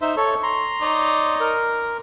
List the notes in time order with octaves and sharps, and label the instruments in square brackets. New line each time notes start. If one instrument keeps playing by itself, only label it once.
[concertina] D#4 E5 [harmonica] C5
[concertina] A4 C#5 [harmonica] C#6
[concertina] A#5 C6
[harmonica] D#4 C#5 D5
[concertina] A#4